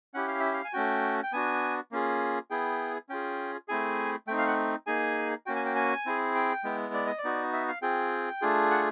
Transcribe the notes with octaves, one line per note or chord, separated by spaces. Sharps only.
C#4 E4 G4 F#5
F5
E5
F5
G#5
A3 C#4 F#4 G5
G5
B3 D4 F#4 G#5
A#3 C#4 F4 G#4
B3 E4 G#4 G5
C#4 F4 G#4 G5
A3 C4 E4 G#4 G#5
A3 C4 D#4 G5
F5
F#5
A#3 D#4 G#4 G#5
A#3 C#4 F#4 G5
G#5
G5
G#5
C4 E4 G#4
G5
G#3 B3 E4
D5
D#5
D5
B3 D#4 F#4
E5
F5
C4 F4 G#4 G5
A3 D4 F4 G#4
F#5